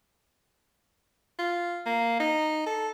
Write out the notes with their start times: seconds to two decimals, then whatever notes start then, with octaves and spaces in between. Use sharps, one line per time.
1.39 F4
1.86 A#3
2.20 D#4
2.66 A4